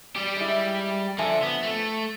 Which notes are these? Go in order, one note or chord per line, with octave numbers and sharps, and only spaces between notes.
G3 G4
G#3 E4
D3 F3 E5 G#5
B3
A3